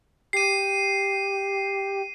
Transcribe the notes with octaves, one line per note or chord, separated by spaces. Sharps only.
G4 C7 D#7